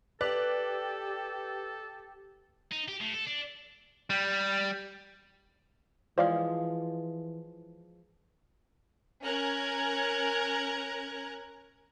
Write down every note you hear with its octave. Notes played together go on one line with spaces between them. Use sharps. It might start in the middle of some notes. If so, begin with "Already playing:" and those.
G4 A4 B4 D5 F#6
D#4
G4
A2
A4
D4
G3
E3 F3 G#3 G#4 C5 D5 F5
C#4 A#4 A#5 F#6 G#6